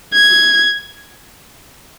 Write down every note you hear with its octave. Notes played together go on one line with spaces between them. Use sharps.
G#6